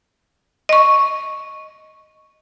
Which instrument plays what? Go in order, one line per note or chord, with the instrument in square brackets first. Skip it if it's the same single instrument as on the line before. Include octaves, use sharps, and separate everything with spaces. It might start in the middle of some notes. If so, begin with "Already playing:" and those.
[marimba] D#5 C#6